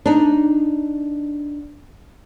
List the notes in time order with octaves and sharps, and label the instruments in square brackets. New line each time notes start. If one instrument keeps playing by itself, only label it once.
[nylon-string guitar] D4 D#4